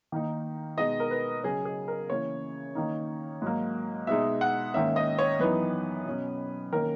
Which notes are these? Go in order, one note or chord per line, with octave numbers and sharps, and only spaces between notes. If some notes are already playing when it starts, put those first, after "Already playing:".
D#3 A#3 D#4
B2 G#3 D#4 D#5
A#4
B4
C#3 F#3 C#4 G#4
G#4
A#4
C#3 E3 A#3 C#5
D#3 A#3 D#4
G#2 F#3 A#3
B2 G#3 D#4 E5
F#5
G#2 D#3 A#3 C#4 E5
D#5
C#5
F#2 E3 B3 D#4 B4
B2 F#3 C#4
D#3 A#3 C#4 A#4